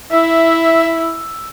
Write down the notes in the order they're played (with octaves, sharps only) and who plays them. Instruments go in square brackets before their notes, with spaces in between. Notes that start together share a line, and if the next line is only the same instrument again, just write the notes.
[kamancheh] E4 [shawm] E5 [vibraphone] E6